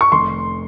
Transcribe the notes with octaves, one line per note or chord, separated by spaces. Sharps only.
C#6
F1 C6